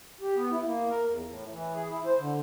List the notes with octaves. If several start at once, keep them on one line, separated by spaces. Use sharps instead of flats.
G4
B3
E4
A#3
A#4
E2
A2
E3
G#4
E4
C5
D3